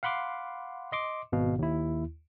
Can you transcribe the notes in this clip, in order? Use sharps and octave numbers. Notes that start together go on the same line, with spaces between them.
F5 F#5 B5 C6 D6
D#5 C6 D6
G#1 B2 F5
D#2 E4